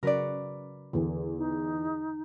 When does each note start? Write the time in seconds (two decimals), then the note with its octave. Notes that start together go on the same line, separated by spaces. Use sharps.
0.03 C#3 F#3 F#4 A#4 B4 D5
0.93 E2 D3 E3
1.38 D#4